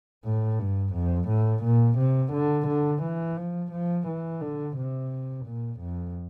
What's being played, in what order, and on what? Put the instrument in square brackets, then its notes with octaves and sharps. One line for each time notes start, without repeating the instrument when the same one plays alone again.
[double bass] A2
G2
F2
A2
A#2
C3
D3
D3
E3
F3
F3
E3
D3
C3
A#2
F2